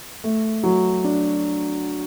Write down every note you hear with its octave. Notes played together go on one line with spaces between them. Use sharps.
A3
F#3
D4